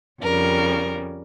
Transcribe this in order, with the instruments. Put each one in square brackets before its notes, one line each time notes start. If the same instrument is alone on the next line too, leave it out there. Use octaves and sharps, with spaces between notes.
[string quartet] F2 C#3 G3 A#4